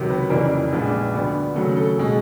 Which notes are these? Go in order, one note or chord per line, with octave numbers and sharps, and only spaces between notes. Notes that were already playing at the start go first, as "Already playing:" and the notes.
Already playing: C#2 C3 D#3 F#3
B4
F2 C#3 E3 G3 A#3 A#4
A#1 A#2 F3 G#3 B3
D2 D3 G3 B3
D#2 C#3 F#3 A3 A4
A4
B2 G#3 G#4